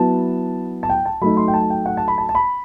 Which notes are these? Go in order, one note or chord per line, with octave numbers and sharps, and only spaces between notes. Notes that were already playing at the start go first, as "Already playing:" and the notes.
Already playing: F#3 B3 E4 A5
A5
G5
A5
F#3 A3 D#4 B5
C6
G5
A5
G5
F#5
A5
B5
A5
A5
B5